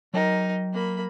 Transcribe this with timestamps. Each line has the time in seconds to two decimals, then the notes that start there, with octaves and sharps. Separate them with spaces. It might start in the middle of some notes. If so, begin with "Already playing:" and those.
0.14 F#3 D#4 A#4 G5
0.73 A#3 B5